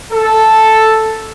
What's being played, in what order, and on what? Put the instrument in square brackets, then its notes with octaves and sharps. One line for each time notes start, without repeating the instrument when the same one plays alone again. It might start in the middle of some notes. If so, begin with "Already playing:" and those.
[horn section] A4